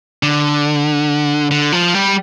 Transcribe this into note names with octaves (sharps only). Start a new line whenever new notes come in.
D3
D3
F3
G3